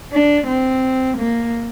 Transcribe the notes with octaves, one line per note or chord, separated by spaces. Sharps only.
D4
C4
A#3